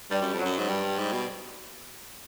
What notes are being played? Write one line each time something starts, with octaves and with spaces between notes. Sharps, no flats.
G2 G3
F#2
F2
F#3
F#2
G#2
G2 G3
G#2
B2